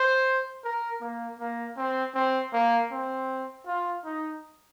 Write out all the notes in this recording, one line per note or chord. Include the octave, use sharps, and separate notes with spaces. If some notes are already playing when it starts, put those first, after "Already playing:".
Already playing: C5
A#4
A#3
A#3
C4
C4
A#3
C4
F4
D#4